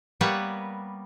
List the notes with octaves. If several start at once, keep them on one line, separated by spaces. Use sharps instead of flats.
G3 A#3 B3 B4 C#5